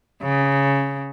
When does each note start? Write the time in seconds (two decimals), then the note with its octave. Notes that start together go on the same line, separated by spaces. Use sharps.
0.22 C#3